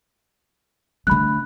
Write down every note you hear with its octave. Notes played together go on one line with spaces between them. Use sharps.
D3 A3 B5 F#6